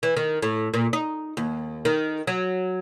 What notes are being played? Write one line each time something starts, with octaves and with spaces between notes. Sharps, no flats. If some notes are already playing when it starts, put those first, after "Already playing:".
E3
D#3
A2
A#2
D#4
D#2
D#3
F#3